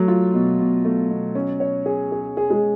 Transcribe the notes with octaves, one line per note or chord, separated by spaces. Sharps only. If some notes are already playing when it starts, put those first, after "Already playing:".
Already playing: F#3 A3
F4
B2
B2
A3
B2
C#4
C#5
G#4
G#4
G#4
G#3